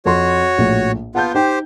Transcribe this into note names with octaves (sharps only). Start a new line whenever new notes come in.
F2 F#4 C#5 C6
A#1 A2
B3 F4 F#5 A5 G6
D#4 G4 C5 G5